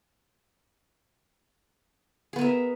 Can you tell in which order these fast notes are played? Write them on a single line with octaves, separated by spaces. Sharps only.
G#4 B3 A#4 E5